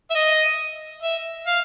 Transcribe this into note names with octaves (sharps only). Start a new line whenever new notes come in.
E5
D#5
E5
F5